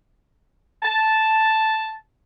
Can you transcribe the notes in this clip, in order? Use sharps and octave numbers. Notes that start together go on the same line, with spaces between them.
A5